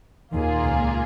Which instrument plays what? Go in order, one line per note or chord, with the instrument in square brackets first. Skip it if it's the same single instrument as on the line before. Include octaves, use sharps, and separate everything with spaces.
[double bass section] D#2 D#3 [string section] A#2 A#3 F4 G#4
[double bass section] C#2 C#3